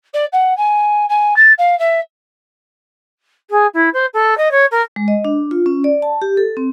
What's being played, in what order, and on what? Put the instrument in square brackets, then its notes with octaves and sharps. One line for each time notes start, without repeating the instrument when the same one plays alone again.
[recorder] D5
F#5
G#5
G#5
A6
F5
E5
[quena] G#4
E4
C5
A4
D#5
C#5
A#4
[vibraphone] G#3
D#5
D4
F4
C#4
D5
A5
G4
A4
C4